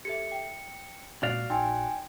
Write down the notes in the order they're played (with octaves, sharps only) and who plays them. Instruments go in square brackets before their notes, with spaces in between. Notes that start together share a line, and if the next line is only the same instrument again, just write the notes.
[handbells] G4 A4 E5 [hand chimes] C#7
[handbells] G5
[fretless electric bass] A#2 G3 G#3 [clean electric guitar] F#4 D5 F5
[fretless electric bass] A#1 [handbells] D#4 C6 [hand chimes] G5 G#5